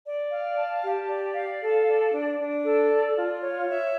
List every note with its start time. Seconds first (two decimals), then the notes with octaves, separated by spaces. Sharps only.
0.05 D5
0.31 F5
0.57 A5
0.82 G4
1.08 D5
1.34 F5
1.60 A4
1.86 D5
2.11 D4
2.38 D4
2.64 A4
2.89 D5
3.15 F4
3.41 C#5
3.68 E5